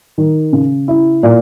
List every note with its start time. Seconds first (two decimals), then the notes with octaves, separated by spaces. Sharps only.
0.18 D#3
0.53 C#3
0.88 E4
1.23 A#2